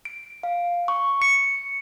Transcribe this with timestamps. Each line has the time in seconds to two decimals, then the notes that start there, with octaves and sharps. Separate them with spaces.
0.05 D7
0.43 F5
0.88 C#6
1.22 C#7